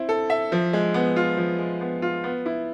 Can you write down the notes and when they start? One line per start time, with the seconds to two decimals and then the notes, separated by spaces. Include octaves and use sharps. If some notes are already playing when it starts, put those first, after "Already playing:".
Already playing: C4 E4
0.09 A4
0.30 E5
0.52 F3
0.73 G#3
0.94 B3
1.16 F4
1.38 F3
1.59 G#3
1.81 B3
2.02 F4
2.24 B3
2.46 E4